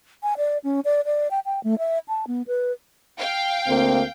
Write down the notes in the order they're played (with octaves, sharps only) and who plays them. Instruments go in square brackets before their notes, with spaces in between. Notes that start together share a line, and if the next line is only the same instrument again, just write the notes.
[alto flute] G#5
D5
C#4
D5
D5
G5
G5
A3
E5
A5
B3
B4
[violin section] F5 G5
[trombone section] D2 A#3 C4